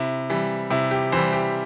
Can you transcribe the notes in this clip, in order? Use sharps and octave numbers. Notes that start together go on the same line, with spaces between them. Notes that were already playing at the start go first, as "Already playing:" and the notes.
Already playing: C3 E4
E3 G3
C3 E4
G4
E3 G3 C5
G4